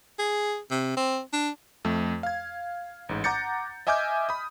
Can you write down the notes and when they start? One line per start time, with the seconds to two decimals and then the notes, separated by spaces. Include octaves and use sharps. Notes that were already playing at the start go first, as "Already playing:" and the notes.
0.19 G#4
0.71 C3
0.97 C4
1.33 D4
1.85 F2 A3
2.23 F5 G#6
3.09 A1 G#2
3.24 F#5 A#5 D6 G6 A6 C#7
3.87 D#5 E5 G#5 D6 F6 G6
4.29 B5 D#6